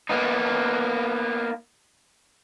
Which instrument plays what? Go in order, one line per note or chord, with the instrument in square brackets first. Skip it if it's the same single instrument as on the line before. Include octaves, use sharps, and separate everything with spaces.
[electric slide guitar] A#3 B3 D#4